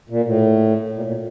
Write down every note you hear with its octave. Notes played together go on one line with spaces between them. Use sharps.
A#2
A2
A#2
A#2